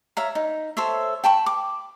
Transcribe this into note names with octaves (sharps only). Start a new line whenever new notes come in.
C#5 E5 F5 A#5
D#4
A4 C5 C#5 E5
G5 A5 B5 C#6
D6